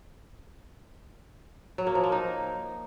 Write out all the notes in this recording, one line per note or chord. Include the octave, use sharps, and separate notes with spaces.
F#3
A#3
F3
A#3
D#4